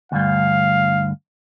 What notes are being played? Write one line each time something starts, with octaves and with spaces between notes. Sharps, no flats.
D2 G2 F5